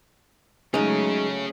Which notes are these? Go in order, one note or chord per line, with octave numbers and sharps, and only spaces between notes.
F#3 G#3 A3 C#4 D#4 G#4 C#5